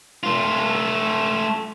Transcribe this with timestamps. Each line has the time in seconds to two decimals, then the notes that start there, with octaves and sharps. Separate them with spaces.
0.23 A3 F4